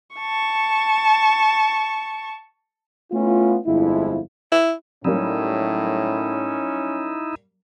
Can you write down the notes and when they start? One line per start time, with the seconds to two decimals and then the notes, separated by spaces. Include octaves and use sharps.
0.16 A5 C#6
3.12 A3 B3 C#4 E4 F4
3.66 G1 F2 F3 G#3 E4
4.52 E4
5.05 A2 F#3 G3 A#3 C#4 D#4 E4